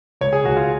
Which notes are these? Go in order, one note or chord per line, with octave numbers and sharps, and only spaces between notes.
C#2 C#5
G#4
C#2 F#4
F4